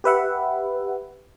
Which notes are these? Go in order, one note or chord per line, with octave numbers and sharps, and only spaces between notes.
G4 B4 E5 F#5